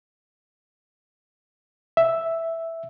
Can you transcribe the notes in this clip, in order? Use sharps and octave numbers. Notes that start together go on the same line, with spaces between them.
E5